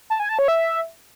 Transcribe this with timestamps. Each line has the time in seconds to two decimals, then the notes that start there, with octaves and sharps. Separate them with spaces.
0.10 A5
0.20 G#5
0.29 A5
0.39 C#5
0.48 E5